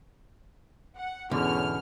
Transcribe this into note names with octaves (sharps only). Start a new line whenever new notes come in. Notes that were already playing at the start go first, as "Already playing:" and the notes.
F#5
E2 G#2 B2 D3 C#4 F6